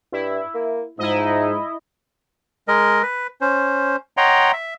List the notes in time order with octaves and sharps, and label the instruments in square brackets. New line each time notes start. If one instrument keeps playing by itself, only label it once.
[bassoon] G2 [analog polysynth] E4
[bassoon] A#3
[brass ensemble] G#2 D#4 [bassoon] F3 [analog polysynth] E4 D#5
[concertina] G#3 A#4 D#5
B4
C#4 C5
C#5 D#5 F#5 G5 A#5 C6
E5